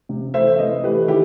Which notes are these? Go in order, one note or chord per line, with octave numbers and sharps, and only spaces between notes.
C3
E3 A3 C5 E5
C3 B4 D#5
E3 A3 G4 B4
D#3 E4 G4